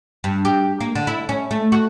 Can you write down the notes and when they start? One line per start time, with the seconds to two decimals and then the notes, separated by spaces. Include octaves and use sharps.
0.24 G2
0.45 G4
0.81 A#3
0.95 D3
1.07 E4
1.29 C#4
1.51 A3
1.72 F#4